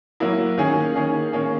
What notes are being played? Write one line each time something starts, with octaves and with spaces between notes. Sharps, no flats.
F#3 A#3 E4
D#3 A#3 C#4 G#4
D#3 A#3 C#4 G#4
D#3 A#3 C#4 G#4